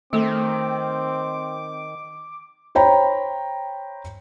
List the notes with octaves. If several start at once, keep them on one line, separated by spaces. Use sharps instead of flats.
D#3 A3 C4 A4 D6
C5 C#5 G5 A#5 B5